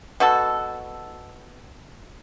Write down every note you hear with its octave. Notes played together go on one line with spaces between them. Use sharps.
B2 F#4 A4